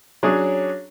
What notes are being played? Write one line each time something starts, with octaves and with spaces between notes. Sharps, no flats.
F#3 C#4 D4 G#4